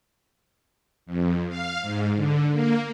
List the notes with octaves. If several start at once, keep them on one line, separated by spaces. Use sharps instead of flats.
F2
F5
G#2
D3
A#3